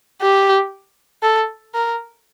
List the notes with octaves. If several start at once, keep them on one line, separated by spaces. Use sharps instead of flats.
G4
A4
A#4